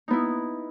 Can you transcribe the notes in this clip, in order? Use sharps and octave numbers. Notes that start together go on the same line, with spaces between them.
B3 D#4 E4